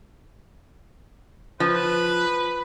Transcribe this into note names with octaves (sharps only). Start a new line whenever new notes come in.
F3 B4